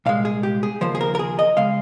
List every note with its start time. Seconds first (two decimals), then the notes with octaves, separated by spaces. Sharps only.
0.06 C2 A#2 G#3 F5
0.25 G#4
0.43 G4
0.63 G#4
0.81 D#2 C#3 F3 A#3 C5
0.95 G#4
1.01 A#4
1.15 A#4
1.19 G#4
1.39 D#5
1.57 C#3 G#3 F5